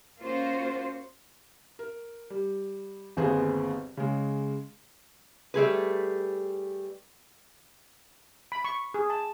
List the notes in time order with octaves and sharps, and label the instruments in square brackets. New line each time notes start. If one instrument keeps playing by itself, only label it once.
[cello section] A#3 C#4 F4 F#4 C5
[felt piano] A#4
G3
G1 D#2 B3 C4 G#4
C#3 G#3
[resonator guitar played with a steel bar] G3 A3 G#4 B4
[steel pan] B5
C#6
G#4
A5